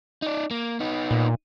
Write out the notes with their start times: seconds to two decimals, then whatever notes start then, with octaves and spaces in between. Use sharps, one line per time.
0.22 D#4 D5
0.51 A#3
0.80 B3 D#4
1.11 A#2